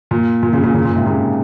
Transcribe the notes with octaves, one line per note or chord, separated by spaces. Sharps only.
A#2
A#2
A#2 C#3
A#2 C#3
A#2 C#3
A#2
G#2 C3
A#2 C#3